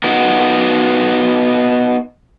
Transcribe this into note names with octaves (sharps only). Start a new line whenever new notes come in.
B3 D#4 F#4 A#4